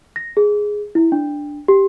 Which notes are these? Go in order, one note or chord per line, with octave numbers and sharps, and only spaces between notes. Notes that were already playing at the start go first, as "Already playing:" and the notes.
A#6
G#4
E4
D4
G4